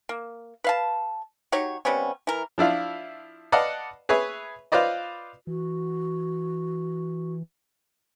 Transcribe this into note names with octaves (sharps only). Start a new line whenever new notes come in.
A#3
B4 F5 A5
F#3 D#4 G4 C#5
C3 G3 B3 C#4
E3 A#4
F3 D4 E4 F4
B4 D5 D#5 F5 F#5 A5
G#4 B4 C#5 E5
F4 B4 C5 D5 D#5
E3 F#4